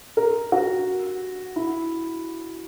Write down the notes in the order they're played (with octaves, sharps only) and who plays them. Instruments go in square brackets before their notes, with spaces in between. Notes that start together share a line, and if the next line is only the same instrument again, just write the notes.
[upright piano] A#4
F#4
E4